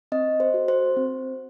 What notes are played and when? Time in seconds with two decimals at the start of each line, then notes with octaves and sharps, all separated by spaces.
0.12 C4 D#5
0.40 C5
0.54 F#4 A4
0.68 C5
0.96 C4